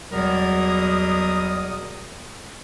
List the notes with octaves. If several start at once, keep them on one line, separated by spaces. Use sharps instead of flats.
E2 B2 F#3 G3 A#4 D#6